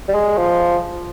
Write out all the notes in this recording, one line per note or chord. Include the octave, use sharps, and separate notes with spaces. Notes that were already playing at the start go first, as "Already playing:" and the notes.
G3
G#3
F3